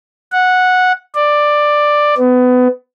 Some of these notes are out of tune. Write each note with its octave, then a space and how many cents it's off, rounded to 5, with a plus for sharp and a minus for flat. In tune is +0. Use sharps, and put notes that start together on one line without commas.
F#5 -10
D5 +10
B3 +25